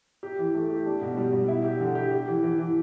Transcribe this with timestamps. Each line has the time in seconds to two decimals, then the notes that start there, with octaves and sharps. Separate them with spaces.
0.23 G4
0.38 E3
0.55 A3
0.70 G4
0.86 D4
1.01 B2
1.17 G3
1.33 B2
1.48 E4
1.64 G4
1.80 D3
1.95 G4
2.11 G4
2.27 E3
2.43 E3
2.58 E3